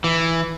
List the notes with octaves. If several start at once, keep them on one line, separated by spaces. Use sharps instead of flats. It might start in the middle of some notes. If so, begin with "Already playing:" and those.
E3